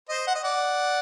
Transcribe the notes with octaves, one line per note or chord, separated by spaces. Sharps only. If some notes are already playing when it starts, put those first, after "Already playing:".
C5 D#5
F#5
D#5
D5 F#5